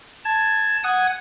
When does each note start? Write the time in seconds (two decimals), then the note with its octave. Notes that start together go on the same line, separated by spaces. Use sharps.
0.25 A5 G#6
0.84 F#5 G#5 D#6 G#6